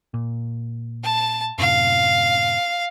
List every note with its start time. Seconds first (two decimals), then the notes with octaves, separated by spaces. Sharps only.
0.14 A#2
1.04 A5
1.58 F#2 A2 C3 F5